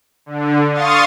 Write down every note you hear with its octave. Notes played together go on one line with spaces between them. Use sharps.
D3
F5 C6 C#6 D#6 A6